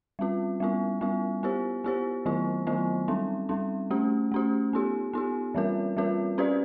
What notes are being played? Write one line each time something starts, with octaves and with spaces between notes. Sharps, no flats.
G3 C4 F4
G3 B3 E4
G3 B3 E4
B3 E4 G4 C5
B3 E4 G4 C5
D#3 F#3 B3 E4
D#3 F#3 B3 E4
G3 C4 D#4
G3 C4 D#4
A3 C#4 F#4
A3 C#4 F#4
B3 D#4 G4
B3 D#4 G4
E3 G3 C4 F4 A#4
E3 G3 C4 F4 A#4
C#4 F#4 B4 D5